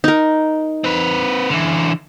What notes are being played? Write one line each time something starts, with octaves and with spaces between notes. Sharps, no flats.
D#4 A#4
C4 B4
D3 E3